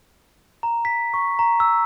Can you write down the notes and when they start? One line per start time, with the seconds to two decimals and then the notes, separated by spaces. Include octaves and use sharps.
0.63 A#5
0.85 B6
1.14 C#6
1.39 A#5
1.60 E6